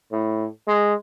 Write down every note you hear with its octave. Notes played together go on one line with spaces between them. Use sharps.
A2
G#3